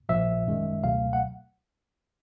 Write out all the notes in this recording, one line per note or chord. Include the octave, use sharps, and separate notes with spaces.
A#1 A#2 F3 E5
G1 F#2 D#3 G#3
C#2 B2 F#3 A3 F5
F#5